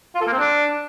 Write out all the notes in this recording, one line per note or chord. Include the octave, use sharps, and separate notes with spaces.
F4
A4
A#3
C4
D4